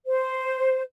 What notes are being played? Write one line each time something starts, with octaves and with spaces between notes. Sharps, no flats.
C5